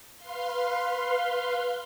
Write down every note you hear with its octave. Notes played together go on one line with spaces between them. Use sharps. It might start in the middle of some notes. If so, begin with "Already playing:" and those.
B4 F5 C6